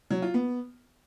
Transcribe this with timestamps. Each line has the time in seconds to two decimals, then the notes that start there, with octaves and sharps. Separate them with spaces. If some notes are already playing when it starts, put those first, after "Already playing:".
0.10 F#3
0.22 F4
0.34 B3